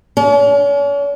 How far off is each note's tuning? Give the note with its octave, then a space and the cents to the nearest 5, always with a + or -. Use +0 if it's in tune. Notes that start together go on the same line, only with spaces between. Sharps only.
C#4 +45